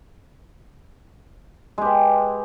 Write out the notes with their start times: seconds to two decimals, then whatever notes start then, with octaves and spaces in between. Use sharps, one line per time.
1.78 G#3
1.81 G4
1.85 B4